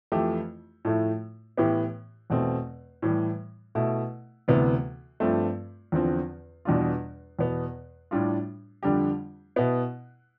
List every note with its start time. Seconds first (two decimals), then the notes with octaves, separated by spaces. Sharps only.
0.12 F2 E3 A3 E4 G4
0.85 A2 F3 A3 E4
1.58 A2 E3 B3 E4 G4
2.30 E2 B2 A3 C4
3.02 A2 E3 G3
3.75 B2 A3 E4
4.48 D2 C3 E3 B3
5.20 G2 F3 A3 C4
5.92 E2 D3 F3 C4
6.65 E2 B2 G3 D4 F4
7.39 E2 B2 B3
8.11 A2 G3 D4 F4
8.83 F2 D3 G3 D4 G4
9.56 B2 B3 E4